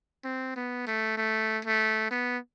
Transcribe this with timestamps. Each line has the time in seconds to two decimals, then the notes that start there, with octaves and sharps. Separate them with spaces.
0.24 C4
0.56 B3
0.87 A3
1.17 A3
1.65 A3
2.11 B3